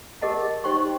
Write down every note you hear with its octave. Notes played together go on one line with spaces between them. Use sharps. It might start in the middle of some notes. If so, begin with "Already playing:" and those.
G4 G#4 A#4 D#5 F#5 A5
D#4 G4 C5 G5 C6 C#6